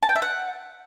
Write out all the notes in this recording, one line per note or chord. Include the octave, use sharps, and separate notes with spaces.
A5
G5
E5
F#5